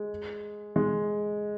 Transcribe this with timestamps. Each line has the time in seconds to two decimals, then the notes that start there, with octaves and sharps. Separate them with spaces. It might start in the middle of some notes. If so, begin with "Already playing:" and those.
Already playing: G#3
0.76 G#3